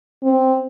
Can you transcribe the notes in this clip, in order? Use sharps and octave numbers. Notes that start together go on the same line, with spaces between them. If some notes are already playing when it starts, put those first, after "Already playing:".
C4